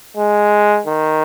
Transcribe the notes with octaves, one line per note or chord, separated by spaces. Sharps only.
G#3
D#3